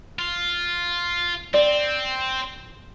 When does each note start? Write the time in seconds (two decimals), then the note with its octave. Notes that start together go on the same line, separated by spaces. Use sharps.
0.19 F4
1.54 C4 D5